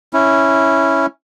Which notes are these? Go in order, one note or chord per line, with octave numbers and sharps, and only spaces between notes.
C#4 E4